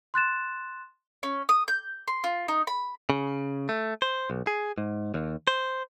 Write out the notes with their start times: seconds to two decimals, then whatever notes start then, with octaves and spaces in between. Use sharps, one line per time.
0.14 C6 F#6 A6 E7
1.23 C#4
1.49 D#6
1.68 G6
2.08 C6
2.24 F4
2.48 D#4
2.67 B5
3.10 C#3
3.69 A3
4.02 C5
4.30 B1
4.47 G#4
4.78 G#2
5.14 D#2
5.47 C5